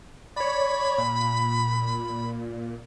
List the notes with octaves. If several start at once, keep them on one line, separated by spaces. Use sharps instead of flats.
C#5 D5 B5
A#2